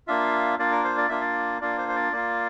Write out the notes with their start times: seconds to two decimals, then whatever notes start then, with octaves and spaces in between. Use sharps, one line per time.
0.07 A#3 D4 F4 E5
0.59 A#3 D4 F4 D5
0.71 A#4
0.84 C5
0.98 D5
1.09 A#3 D4 F4 E5
1.21 D5
1.61 A#3 D4 F4 D5
1.78 C5
1.88 C5
1.96 D5
2.12 A#3 F4